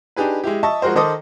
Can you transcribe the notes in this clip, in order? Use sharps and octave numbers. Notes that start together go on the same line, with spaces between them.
D4 D#4 G4 G#4 B4
G#3 E4 G4
D#5 E5 A5 C#6
F3 G#3 F#4 A#4 C5
D#3 A4 C5 D#5 D6 D#6